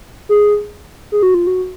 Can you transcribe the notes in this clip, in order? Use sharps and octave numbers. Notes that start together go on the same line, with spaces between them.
G#4
G#4
F#4
F4
F#4